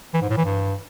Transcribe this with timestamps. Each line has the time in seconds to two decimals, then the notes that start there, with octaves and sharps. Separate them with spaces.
0.14 E3
0.22 G#2
0.29 A2
0.37 E3
0.45 G2